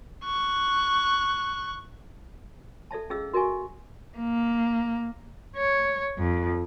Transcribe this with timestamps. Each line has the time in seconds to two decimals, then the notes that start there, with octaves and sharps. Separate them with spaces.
0.24 C#6 F#6
2.91 A4 D5 E5 A5
3.10 C#4 G#4 D#5 F5 E6
3.33 F#4 A#4 D#5 E5 G#5 C#6
4.18 A#3
5.56 C#5
6.19 F2